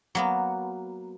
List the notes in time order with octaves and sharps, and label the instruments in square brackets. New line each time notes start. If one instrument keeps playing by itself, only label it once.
[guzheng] F#3 A#3 B3